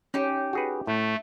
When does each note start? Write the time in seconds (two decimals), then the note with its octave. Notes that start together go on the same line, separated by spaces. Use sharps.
0.14 C#4 D#4 G4
0.53 F#4 G#4 B4
0.87 A2 A3